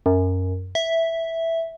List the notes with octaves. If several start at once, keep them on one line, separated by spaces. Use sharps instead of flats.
F#2
E5